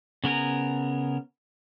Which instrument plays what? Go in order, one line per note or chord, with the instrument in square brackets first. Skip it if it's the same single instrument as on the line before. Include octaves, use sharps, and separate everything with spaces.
[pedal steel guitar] C#3 B3 A#4 G#5 A#5